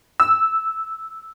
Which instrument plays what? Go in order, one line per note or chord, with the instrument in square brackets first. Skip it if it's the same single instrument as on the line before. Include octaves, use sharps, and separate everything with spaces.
[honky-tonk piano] E6